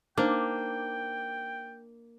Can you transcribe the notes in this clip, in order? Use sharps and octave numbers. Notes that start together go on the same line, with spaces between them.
A#3 D4 D#4 C5 G5 D6